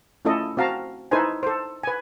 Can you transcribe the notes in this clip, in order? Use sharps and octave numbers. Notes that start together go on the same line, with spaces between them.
A3 C#4 E4 F4 A4 D#5
C4 F#4 F5 A5 A#5
D#4 E4 A4 B4 C5 G#5
A4 C5
B4 G#5